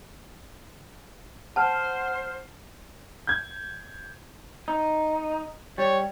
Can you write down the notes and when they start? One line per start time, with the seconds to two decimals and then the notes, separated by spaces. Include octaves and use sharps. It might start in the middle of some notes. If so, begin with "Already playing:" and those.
1.56 C5 F#5 A5 F6
3.27 G6 G#6
4.68 D#4
5.78 G3 C#5